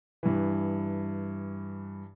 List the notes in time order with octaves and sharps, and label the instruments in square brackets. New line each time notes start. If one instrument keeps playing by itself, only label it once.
[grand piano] G2 E3